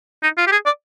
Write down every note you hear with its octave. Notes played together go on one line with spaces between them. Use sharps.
D#4
F4
G4
G#4
D5